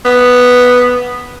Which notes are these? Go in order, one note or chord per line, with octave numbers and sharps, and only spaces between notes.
B3